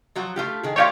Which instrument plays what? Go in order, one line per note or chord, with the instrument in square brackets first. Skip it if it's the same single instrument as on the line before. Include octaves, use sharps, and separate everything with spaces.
[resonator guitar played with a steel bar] F3 F#3 F#4
A3 F4 G4
D#3 G#4
[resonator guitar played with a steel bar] A3 D5 G5 [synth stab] F4 G4 C#5